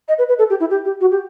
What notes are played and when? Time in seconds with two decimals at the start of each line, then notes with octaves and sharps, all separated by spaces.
0.08 D#5
0.18 B4
0.29 B4
0.38 A4
0.50 G4
0.60 E4
0.70 G4
0.85 G4
1.01 F#4
1.11 G4